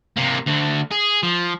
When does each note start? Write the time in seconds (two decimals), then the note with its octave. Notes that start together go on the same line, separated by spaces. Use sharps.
0.17 C3 A#3
0.46 D2 D3
0.91 G#4
1.23 F3